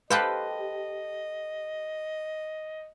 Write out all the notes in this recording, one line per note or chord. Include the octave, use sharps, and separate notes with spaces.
G4 A4 B4 C5 D#5 F5